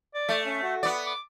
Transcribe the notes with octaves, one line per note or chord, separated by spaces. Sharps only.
D5
A3
C#4
F#4
B3 D5
D6